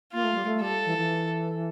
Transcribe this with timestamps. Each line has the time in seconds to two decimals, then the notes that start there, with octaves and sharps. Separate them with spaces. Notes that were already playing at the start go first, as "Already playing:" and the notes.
0.13 A#3 F4
0.24 A3
0.35 G3
0.45 A3
0.62 G3 A4
0.86 E3
0.98 E3